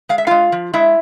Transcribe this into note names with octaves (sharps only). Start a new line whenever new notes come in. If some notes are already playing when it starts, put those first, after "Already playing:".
G#3 F5
E5
G#3 F4 F5
F3
G#3 E4 E5